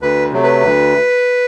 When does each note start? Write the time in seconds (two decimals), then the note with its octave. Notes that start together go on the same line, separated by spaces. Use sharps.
0.01 D2 B4
0.32 C3 F#3 A3
0.43 B4
0.63 D2